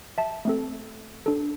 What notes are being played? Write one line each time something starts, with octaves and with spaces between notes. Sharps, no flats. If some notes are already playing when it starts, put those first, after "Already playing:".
E5 A5
A3 C4 A4
D4 A4